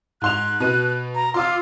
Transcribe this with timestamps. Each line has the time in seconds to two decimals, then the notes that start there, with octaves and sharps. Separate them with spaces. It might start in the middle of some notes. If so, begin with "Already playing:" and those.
0.22 G#2 C6 F#6 F7
0.60 B2 B4 D#7
1.15 A#5
1.34 F4 C6 D6 E6